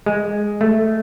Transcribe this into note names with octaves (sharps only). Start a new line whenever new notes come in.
G#3
A3